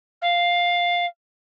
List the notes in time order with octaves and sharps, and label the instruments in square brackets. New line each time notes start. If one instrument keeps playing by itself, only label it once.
[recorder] F5